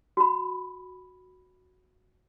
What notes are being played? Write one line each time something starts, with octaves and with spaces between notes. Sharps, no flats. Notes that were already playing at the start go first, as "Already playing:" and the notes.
F#4 B5